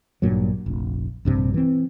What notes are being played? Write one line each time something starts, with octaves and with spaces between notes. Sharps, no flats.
A1 G2 A#2 F#3
F1 A#1
A#1 G2 C3
E3 C4